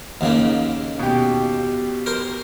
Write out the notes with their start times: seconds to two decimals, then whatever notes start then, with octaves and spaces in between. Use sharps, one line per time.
0.21 D#2 C#3 A#3
0.99 B2 G4
2.06 A#4 C5